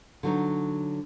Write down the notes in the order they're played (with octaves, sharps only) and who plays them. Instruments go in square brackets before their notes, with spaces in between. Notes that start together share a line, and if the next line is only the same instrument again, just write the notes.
[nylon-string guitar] D3 F#3 D#4